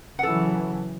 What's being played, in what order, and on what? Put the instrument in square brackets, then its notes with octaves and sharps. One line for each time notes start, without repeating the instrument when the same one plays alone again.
[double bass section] C#3 E3 F#3 [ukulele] A4 F#5